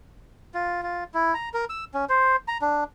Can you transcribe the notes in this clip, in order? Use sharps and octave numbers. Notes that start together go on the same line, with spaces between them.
F4
F4
E4
A#5
A#4
E6
C#4
C5
A#5
D4